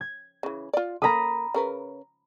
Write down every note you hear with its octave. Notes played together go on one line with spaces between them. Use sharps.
G#6
C#3 E3
F4 D5
A#3 A4 A#5 B5 D#6
C#3 A#4 B4